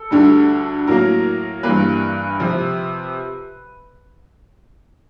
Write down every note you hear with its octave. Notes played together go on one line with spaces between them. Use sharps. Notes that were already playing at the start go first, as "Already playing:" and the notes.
Already playing: A4
D2 D3 G3
A2 F#3 A#3 A#4
G2 E3 G3 A#3 B4
C3 F3